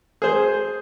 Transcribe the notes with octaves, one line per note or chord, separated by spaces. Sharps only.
G#4 C5